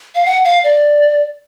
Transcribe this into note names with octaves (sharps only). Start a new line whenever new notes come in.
F5
F#5
F5
D5